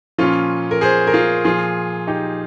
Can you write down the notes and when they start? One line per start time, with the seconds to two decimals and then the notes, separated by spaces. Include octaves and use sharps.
0.18 A#2 F3 C#4 F4
0.71 A#4
0.81 G#4 C5
1.07 A#4
1.13 F4 G#4
1.44 A#2 F3 F4 G#4
2.07 D#4 G4